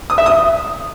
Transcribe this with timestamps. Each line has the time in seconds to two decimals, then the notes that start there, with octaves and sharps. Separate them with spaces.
0.10 D#6
0.18 E5
0.26 D#6